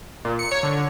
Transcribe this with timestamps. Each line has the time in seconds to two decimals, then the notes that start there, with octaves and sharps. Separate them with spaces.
0.25 A#2
0.39 C#7
0.52 C#5
0.63 D3